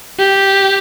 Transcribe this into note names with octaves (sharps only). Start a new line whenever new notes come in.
G4